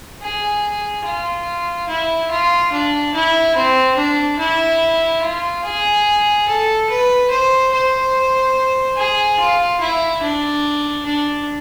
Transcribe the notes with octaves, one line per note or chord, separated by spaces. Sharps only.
G#4
F4
E4
F4
D4
E4
C4
D4
E4
F4
G#4
A4
B4
C5
C5
G#4
F4
E4
D4
D4